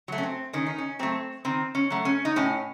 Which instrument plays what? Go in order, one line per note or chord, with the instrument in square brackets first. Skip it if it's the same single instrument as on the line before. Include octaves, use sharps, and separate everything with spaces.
[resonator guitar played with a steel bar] F#3 A3
C#4
C4
D#3 C#4
D#4
C#4
F#3 A3 C4
D#3 C4
C#4
F#3 A3
C#4
D#4
A2 C#4